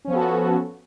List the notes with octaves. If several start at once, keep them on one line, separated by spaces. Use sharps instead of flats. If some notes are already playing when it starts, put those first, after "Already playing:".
F3 B3 C#4 F#4 A4